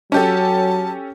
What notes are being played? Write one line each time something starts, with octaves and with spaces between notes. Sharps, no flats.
F#3 C#4 G4 A4 A5